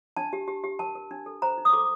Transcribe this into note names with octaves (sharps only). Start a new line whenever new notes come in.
D4 A5
G4
G4
G4
A#4 A5
A#4
D4
A4
C5 A#5
D#4
D#6
A4 D6